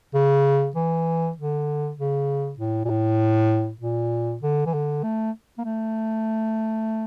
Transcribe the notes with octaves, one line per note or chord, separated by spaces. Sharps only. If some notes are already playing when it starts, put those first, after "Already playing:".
C#3
E3
D3
C#3
A2
A#2
A2
A#2
D3
E3
D3
A3
A#3
A3